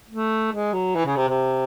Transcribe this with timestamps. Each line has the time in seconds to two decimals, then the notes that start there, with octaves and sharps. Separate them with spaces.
0.09 A3
0.52 G#3
0.73 F#3
0.95 E3
1.06 C#3
1.16 C3
1.28 C3